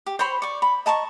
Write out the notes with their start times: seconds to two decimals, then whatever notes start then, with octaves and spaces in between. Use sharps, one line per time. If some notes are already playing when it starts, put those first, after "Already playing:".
0.06 G4
0.19 C5 C#5 B5 C6
0.42 D5 C#6
0.62 B5
0.86 D#5 A5 A#5 C#6